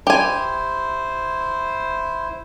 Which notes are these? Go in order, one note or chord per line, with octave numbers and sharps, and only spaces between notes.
E4 G4 C5 G#5